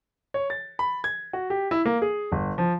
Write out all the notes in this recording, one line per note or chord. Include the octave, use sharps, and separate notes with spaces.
C#5
A6
B5
G#6
F#4
G4
E4
A#3
G#4
G1
F3